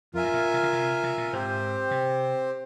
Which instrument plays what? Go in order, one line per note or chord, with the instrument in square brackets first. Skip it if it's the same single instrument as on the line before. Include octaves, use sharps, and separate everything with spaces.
[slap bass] F2 [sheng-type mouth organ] F4 A#4 E5 G#5
[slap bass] G2
A#2
C3
C#3
C3
C3
A#2
[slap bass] G#2 [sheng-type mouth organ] C4 G4 C5
[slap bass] C3